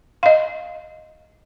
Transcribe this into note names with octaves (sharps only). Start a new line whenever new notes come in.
D#5 F5